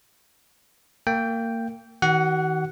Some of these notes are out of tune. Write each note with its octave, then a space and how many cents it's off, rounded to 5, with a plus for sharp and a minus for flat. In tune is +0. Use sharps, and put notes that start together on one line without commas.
A#3 -30 G5 +0
D#3 +30 F#4 +40 F#5 +0